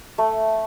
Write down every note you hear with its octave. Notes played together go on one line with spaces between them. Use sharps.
A3